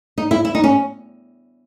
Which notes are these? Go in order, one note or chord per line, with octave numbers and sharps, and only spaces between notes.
D#4
E4
E4
D#4
C#4